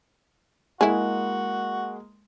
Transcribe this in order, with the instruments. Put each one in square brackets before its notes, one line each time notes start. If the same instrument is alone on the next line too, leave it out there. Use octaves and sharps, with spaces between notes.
[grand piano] G#3 A#3 [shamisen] E4 G#4 [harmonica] F#4